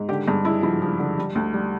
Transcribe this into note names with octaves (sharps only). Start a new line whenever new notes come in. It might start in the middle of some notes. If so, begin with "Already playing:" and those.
Already playing: G#2
D3 G4
G2 G#4
G#3 E4
F3 E4
F3
D3
G3
D2
G3